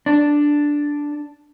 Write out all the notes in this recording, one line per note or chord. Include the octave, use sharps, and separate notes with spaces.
D4